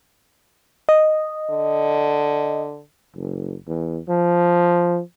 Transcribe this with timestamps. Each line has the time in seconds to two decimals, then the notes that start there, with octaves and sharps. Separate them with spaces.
0.89 D#5
1.50 D3
3.16 F#1
3.67 E2
4.09 F3